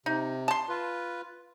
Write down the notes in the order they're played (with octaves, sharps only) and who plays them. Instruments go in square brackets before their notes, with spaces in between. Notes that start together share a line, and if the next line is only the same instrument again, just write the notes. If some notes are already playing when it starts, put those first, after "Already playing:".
[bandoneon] C3 [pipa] D#4
[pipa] A5 C6
[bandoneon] F4 B4